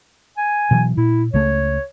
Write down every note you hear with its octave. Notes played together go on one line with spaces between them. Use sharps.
G#5
B2 E3 F#3
A#2 E4
C#2 C#3 A3 C#5